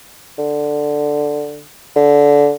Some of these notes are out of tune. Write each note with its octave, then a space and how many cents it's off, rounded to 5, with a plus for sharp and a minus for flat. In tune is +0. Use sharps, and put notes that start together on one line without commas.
D3 +5
D3 -20